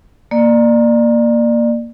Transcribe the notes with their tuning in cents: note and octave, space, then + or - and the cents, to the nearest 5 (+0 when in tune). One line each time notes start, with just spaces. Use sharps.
A#3 +0 D5 +25